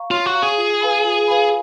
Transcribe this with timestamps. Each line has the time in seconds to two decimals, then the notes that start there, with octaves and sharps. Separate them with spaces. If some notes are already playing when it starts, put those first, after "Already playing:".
Already playing: F5 A#5 C#6
0.11 F4 C#5
0.26 F#4
0.34 F5 A#5 C#6
0.42 G#4
0.58 F4
0.80 B4 F5 G#5 B5
1.04 F4
1.28 B4 F5 G#5 B5